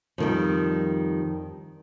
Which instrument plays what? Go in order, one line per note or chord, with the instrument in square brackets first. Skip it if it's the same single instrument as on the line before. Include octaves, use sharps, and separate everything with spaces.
[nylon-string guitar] F2 D#3 G3